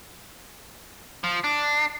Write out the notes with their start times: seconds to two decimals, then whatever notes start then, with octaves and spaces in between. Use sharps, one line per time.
1.24 F3
1.44 D4